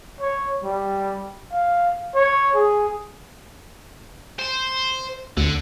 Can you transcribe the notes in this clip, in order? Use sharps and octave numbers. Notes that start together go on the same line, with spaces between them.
C#5
G3
F5
C#5
G#4
C5
D2 D3